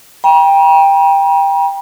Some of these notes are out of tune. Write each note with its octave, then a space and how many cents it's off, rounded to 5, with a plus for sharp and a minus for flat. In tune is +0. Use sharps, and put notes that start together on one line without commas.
G5 +15 A#5 +45